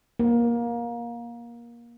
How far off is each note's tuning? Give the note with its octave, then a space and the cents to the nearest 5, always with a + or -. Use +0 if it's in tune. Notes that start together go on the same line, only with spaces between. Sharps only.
A#3 +20